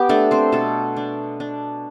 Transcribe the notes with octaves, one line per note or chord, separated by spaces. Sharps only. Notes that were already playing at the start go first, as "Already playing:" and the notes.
Already playing: B3 G4
A3 D4 A4
C4 C5
B2 A4 A5
D4
D4